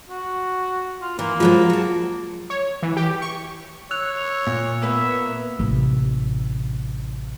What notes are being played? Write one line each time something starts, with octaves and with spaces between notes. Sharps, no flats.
F#4
F4
E3 A#3
F3 F#3 G#3 F4
F#4 A5
C#5
E3
G4
C#6
C#5 E6 F#6 F7
A#2
A#3 B3 B4 E5
A1 C3